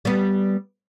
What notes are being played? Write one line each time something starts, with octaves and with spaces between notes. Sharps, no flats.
G3 B3